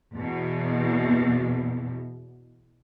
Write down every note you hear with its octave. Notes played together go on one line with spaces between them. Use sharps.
E2 B2